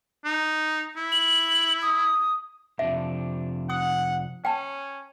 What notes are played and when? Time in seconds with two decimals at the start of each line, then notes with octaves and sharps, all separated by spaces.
0.25 D#4
0.96 E4
1.12 F#7
1.82 D#6
2.79 F2 C3 D4 E5
3.70 F#5 D#6
4.45 C#4 G5 A5